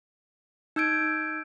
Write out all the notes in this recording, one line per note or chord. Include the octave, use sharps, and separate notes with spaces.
D#4 E6 G6 G#6 D7